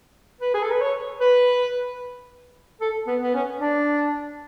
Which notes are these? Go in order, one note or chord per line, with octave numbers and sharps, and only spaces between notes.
B4
G#4
A4
B4
C#5
B4
A4
B3
B3
C#4
D4